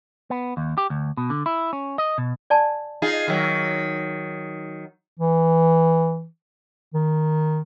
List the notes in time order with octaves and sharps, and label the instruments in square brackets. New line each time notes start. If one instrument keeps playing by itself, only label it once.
[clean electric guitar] B3
D#2
G4
D2
B2
D3
E4
C#4
D#5
B2
[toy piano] D5 G#5 A5
[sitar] D#4 F4 G#4
D#3 F#3
[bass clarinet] E3
D#3